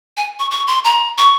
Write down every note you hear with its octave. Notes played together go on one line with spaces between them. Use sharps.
G#5
C#6
C#6
C6
A#5
C#6